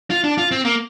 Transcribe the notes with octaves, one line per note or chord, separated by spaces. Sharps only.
F4
D4
F4
C4
A#3